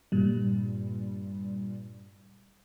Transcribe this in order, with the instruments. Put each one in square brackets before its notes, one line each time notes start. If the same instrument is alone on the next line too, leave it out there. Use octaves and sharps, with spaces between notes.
[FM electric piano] G2 A#2 G3